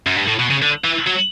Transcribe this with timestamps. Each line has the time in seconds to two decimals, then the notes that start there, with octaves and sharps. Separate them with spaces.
0.06 F#2
0.16 G2
0.28 A2
0.39 B2
0.51 C#3
0.62 D3
0.84 E3
1.07 F#3